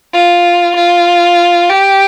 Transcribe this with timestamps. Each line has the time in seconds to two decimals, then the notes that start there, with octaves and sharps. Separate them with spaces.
0.14 F4
0.76 F4
1.70 G4